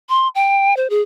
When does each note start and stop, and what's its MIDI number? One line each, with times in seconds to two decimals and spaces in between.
0.09 0.28 84
0.35 0.76 79
0.77 0.88 72
0.90 1.02 68